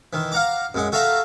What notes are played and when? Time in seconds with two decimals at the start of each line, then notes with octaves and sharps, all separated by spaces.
0.13 D#3 E3
0.32 F5 F#5 A#5 D6
0.75 F#2 G#3 F#5
0.92 F#4 A4 E5 F5 A#5